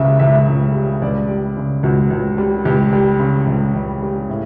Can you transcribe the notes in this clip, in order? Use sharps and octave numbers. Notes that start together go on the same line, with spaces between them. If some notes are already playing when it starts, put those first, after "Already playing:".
Already playing: C#2 C#3 G3 E5
C#2 E5
C#2
G3
C#2 D5
G3
C#3
C#2 F#4
C#2
G3
C#2 G4
G3
C#3
C#2
C#2
G3
A2